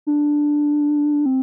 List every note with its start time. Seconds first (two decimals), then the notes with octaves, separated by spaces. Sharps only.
0.07 D4
1.26 C4